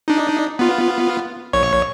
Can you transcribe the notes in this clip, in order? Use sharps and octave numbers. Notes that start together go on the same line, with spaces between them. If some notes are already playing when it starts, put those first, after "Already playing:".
D4 D#4
B3 F4
A#1 C#5 C#6